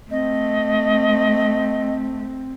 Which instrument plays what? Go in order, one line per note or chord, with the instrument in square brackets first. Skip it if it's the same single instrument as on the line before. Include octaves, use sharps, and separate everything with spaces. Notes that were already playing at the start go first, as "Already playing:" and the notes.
[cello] A3 [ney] C4 [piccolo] D#5